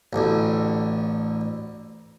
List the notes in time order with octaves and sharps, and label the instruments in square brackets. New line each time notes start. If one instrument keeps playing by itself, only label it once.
[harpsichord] A1 D2